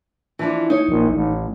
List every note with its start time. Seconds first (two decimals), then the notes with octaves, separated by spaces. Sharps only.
0.39 E3 F3 D4
0.70 D#4 C#5
0.89 A#1
1.13 A1